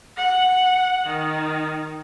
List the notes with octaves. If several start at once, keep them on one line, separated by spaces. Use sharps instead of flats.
F#5
D#3